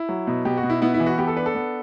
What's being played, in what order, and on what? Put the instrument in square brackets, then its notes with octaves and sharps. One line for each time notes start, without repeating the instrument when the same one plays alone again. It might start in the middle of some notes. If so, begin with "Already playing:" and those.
Already playing: [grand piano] E4
F#3
B2
B2 G4
F#4
B2
E4
B3 E4
E4
E3
F#4
B3 G4
A4
D4 B4
A4
B3